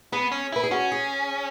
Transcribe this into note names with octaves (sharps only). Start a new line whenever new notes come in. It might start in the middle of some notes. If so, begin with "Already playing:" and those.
B3 G#4
C#4
E4 B4
G#4
C#4 F#4
G#4